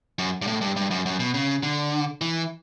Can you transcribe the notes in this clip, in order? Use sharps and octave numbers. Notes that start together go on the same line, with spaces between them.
F#2
G2
A2
G2
G2
F#2
F#2
B2
C#3
D3
E3